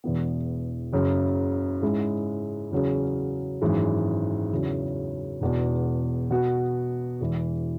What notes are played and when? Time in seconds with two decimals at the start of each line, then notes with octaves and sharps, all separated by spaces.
0.04 E1 E2 E3 B3
0.92 F#1 F#2 C#3 F#3
1.82 G#2 G#3 C#4 E4 G#4
2.71 E2 C#3 F#3 C#4 G#4
3.61 G#1 F#2 E3 G#3
4.52 E2 C#3 F#3 C#4 E4
5.41 E1 E2 B2 B3
6.30 B2 B3 F#4
7.21 E1 E2 E3